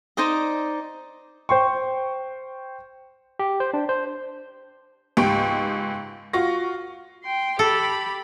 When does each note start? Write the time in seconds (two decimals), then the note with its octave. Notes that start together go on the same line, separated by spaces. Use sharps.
0.17 D#4 C5 D5 D#5
1.49 C5 G5 C6 C#6
3.39 G4
3.60 C5
3.74 D4
3.89 C5
5.17 C#2 G#2 G4 G5 C#6 D7
6.33 F4 F#4 C#6 A#6
7.23 G5 C6
7.59 G4 A4 B5